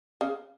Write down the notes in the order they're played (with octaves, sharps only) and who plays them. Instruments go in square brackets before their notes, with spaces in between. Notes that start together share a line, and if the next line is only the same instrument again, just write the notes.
[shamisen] C#3